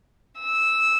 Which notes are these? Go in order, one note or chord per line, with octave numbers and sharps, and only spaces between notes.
E6